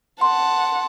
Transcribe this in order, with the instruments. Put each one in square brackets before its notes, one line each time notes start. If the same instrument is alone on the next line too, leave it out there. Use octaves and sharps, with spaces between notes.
[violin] F#5 A5 [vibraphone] C6